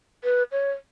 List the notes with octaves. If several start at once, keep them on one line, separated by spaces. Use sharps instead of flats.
B4
C#5